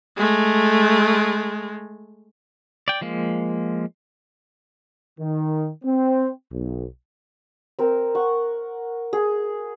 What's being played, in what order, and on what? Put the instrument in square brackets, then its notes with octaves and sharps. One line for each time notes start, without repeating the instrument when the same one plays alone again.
[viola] G#3 A3
[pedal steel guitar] D5 G5
F3 G#3 A#3
[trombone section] D#3
C4
B1
[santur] C4 A#4
F#5 C#6
G#4